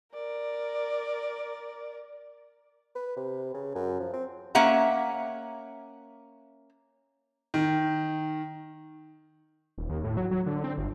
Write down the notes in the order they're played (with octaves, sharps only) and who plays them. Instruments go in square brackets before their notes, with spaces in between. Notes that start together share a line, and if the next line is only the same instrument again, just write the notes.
[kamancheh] A#4 D5
[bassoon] B4
C3
C#3
F#2
F3
C4
[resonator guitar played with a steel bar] A#3 C#4 E5 F#5 A#5
[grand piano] D#3
[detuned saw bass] D#1
D#2
A2
F#3
F#3
D3
C4
G1